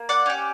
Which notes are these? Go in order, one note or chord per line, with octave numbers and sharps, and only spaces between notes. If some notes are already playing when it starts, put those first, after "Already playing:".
Already playing: A#3
D5 F#5
C#4 G4